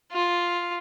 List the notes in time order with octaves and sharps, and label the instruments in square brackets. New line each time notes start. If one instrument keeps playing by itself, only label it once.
[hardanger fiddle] F4